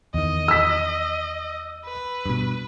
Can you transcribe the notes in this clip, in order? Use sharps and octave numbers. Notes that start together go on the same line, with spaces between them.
E2 D#3 D#5
E6 B6
B4
G2 B2